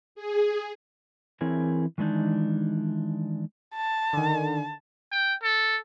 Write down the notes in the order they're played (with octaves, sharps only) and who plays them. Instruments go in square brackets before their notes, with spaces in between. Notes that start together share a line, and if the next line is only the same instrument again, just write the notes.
[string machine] G#4
[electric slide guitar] E3 C4 E4 G#4 A#4 C#5
D#3 E3 G#3 D4 D#4
[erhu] A5
[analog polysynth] D3 D#3
[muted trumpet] G5
A4